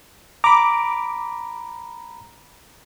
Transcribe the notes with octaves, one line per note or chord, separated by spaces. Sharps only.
A#5 B5 D6